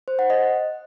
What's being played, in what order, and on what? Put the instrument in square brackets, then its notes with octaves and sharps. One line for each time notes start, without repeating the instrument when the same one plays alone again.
[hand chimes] C5
F#5
D#5